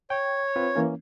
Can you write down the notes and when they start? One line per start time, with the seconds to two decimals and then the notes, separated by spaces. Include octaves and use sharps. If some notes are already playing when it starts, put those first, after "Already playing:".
0.10 C#5 G5
0.56 C4 F4 B4
0.76 E3 A#3 C#4